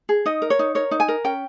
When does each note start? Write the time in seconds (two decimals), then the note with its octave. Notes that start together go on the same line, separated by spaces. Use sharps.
0.09 G#4
0.26 D#4 D#5
0.42 A#4
0.50 C#5
0.59 D#4
0.75 A#4 C#5
0.91 D#4
1.00 G#5
1.08 A#4
1.24 C#4 G5